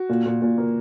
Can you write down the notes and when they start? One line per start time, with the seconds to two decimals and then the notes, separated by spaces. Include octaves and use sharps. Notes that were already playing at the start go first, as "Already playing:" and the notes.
Already playing: F#4
0.09 A#2
0.26 A#2
0.42 A#2
0.58 A#3